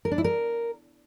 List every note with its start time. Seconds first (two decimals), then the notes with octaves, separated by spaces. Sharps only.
0.05 A#4
0.11 D4
0.18 E4
0.24 A#4